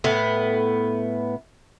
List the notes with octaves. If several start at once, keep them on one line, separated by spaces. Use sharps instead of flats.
A2 B3